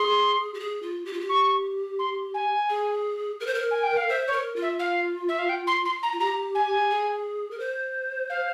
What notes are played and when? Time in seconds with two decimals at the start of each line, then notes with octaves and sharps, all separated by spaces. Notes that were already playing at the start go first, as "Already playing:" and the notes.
Already playing: G#4 C6
0.54 G4
0.60 G#4
0.82 F4
1.06 G4
1.13 F4
1.21 G4
1.29 C#6
1.99 C6
2.34 G#5
2.70 G#4
3.40 A#4
3.47 C5
3.55 A#4
3.71 G#5
3.83 G5
3.97 F5
4.09 C5 E5
4.28 C#5
4.33 A#4
4.56 F4
4.62 E5
4.79 F5
5.29 E5
5.39 F5
5.49 G5
5.67 C6
5.85 C6
6.03 A#5
6.13 F4
6.20 G4 A#5
6.55 G#5
6.90 G#4
7.51 A#4
7.59 C5
8.30 F5